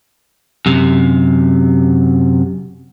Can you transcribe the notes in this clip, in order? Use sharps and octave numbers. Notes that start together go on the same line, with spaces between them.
F#2 C3